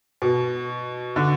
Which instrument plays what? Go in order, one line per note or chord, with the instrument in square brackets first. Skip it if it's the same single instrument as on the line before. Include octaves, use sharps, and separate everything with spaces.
[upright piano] B2
D3